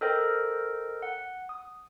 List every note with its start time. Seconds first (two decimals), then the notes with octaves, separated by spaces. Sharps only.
0.01 A4 A#4 C5 D#5 G5
1.02 F#5
1.49 D#6